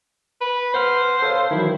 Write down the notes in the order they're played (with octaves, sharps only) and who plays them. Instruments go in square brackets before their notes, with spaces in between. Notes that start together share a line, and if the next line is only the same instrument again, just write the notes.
[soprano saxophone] B4
[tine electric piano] B4 F#5 F6 [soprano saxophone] C5
[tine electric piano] A4 C#5 F5
[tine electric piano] D#3 E3 F#3 [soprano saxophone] E4